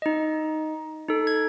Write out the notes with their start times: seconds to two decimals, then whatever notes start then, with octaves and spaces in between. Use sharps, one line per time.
0.02 D#4 D#5
1.08 D#4 A4
1.27 G#6